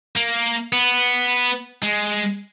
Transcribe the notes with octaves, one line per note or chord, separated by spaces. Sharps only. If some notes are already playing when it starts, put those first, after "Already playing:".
A#3
B3
G#3